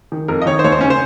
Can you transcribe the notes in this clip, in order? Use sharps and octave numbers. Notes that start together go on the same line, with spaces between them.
D#3
F2 A#4
D#5
D#3 C#5
C5
D#2 C#5
C5
C#3 C#4
C5